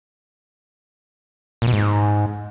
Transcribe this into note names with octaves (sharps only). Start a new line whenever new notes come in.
A#2
B2
G#2